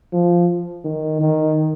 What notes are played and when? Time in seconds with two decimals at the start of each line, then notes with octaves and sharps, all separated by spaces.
0.12 F3
0.84 D#3
1.21 D#3